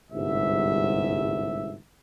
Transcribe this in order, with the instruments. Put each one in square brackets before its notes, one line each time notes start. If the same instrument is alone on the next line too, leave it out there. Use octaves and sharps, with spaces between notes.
[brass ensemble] G1 C2 G#2 E5